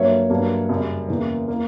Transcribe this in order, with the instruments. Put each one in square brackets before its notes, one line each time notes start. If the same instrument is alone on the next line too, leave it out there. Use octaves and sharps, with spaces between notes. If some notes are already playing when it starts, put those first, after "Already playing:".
Already playing: [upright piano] G2 F#3 A#3 C#5 E5
G2 F#3 A#3
F#2 C#3 G3
E2 C#3 E3 A#3
A#3